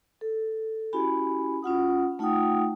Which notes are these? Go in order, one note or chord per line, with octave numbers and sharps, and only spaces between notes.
A4
C#4 E4 F#4 G4 G#5 B5
C#4 F4 F#5 D#6
A3 D#4 F4 F#5 G5 D#6